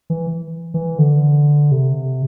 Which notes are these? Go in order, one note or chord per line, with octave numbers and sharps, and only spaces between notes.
E3
E3
D3
C3